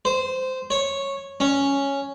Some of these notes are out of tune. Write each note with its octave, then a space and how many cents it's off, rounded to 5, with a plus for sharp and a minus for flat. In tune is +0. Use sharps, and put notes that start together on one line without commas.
C5 -15
C#5 -10
C#4 +0